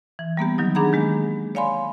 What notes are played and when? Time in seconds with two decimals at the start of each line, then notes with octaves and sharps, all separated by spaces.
0.19 E3
0.37 G3 A#3 B3 G4
0.58 D#3 F#3 D#4
0.75 D4 G#4 F#5 A#5 B5
0.93 D#3 G#3 A#3
1.55 C#5 D5 F5 G#5 B5 C6